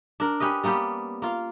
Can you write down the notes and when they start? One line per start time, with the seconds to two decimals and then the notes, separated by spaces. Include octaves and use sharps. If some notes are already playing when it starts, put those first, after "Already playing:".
0.20 D4 A#4
0.40 C#4 G4 B4 D#5
0.63 G3 A#3 B3 G4
1.22 A#3 F4 F5